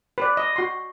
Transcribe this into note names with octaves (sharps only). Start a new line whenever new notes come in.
B4 D5
D#5
F#4 C6